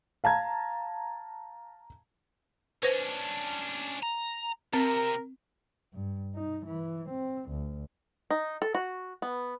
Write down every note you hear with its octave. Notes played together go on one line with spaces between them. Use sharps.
F5 A5 A#5 G#6
C#4 D4 B4 C5
A#5
C3 C4 A#4
G2
D#4
E3
C4
D2
D#4
A4
F#4
B3